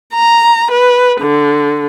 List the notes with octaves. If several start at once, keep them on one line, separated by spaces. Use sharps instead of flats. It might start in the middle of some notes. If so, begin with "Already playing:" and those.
A#5
B4
D3